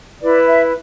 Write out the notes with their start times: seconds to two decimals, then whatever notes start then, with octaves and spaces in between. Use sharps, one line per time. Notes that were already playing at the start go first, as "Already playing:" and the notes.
0.22 E4 B4 D5
0.45 E5